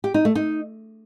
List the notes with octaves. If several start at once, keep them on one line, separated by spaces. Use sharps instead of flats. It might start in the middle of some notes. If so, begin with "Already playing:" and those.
G4
D#4
A3
D#4